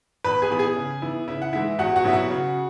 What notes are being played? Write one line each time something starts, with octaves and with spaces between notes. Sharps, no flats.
E2 B4 B5
G#4 G#5
E3 B3 B5
G#4 G#5
C#3
E3 B3 E4
C#3 E4 E5
F#5
E3 G#3 E4 E5
E2 F#4 F#5
F#4 F#5
B2 F#3 C#4 E4 E5
F#4 F#5
C#3